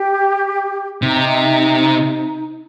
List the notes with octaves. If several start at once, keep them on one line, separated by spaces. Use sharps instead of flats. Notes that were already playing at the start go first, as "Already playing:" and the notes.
Already playing: G4
C3 D#4